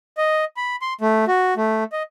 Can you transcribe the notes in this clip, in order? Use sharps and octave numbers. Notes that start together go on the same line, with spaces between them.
D#5
B5
C6
A3
F#4
A3
D#5